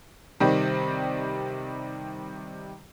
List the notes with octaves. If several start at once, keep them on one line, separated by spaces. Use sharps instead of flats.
C3 D#3 G3